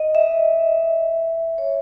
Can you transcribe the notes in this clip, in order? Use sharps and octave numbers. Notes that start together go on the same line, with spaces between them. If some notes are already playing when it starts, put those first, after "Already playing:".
Already playing: D#5
E5
C#5